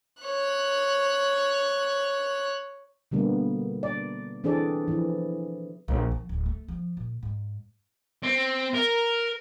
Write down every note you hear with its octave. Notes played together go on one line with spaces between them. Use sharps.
C#5 F#6
B2 D3 G3 A#3 B3
D5
E3 C4 D4 G#4 A4 D5
E3 F3
A#1
F3
D1
A3
F3
A#2
G#2
C4
A#4